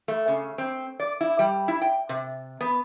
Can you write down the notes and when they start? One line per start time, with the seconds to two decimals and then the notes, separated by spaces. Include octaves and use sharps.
0.08 A3
0.28 C#3
0.58 C4
1.00 D5
1.21 E4
1.39 G3
1.68 E4
1.82 G5
2.09 C3
2.61 B3